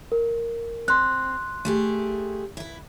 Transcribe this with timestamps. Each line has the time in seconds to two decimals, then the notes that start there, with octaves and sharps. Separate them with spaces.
0.12 A#4
0.88 C4 C6 F#6
1.65 A3 G4 G#4
2.57 E4 B4